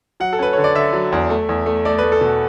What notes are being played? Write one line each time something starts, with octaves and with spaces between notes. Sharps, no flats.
F#3 F#5
A4
C#4 B4
D3 C#5
D5
D3 E5
F#3
E2
A3
E2
A3
A3 D5
A3 B4
A4
B2 F#4